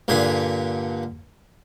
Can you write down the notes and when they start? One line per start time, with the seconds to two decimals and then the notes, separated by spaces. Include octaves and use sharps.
0.08 G2 A#2 D3 G#5